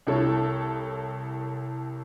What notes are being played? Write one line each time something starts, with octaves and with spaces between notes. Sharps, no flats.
C2 E4 A4 C#5